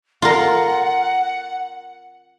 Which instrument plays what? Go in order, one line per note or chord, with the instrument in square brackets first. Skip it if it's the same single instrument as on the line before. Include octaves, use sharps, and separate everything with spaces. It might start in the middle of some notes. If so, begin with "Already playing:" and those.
[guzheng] F4 A#4 [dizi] F#5